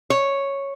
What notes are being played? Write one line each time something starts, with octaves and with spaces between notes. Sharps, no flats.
C#5